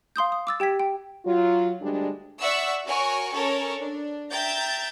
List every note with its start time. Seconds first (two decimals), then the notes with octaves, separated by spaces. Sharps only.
0.16 F5 C6 D#6 G6
0.32 D#6
0.47 D6 E6 A6
0.60 G4 G5 G#6 B6
0.80 G5
1.25 F#3 F4
1.81 D2 G3 G#3 D4
2.40 D5 E5 F#5 C#6 E6
2.87 F#4 A#4 C#5 G#5 C#6
3.35 C#4 A4 A#4 C#5
3.80 D4
4.31 E5 G5 A#5 G6 A6